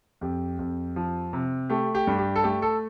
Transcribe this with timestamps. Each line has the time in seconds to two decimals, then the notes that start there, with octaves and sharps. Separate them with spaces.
0.21 F2 G4
0.59 F2
0.96 F3
1.33 C3
1.70 A3 G4
1.95 G4
2.07 G2
2.18 G4
2.36 A4
2.44 A3 G4
2.62 A4